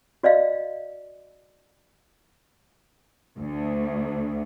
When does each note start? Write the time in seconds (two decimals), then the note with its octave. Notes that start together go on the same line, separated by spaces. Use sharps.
0.23 F#4 D5 D#5 F5
3.39 D2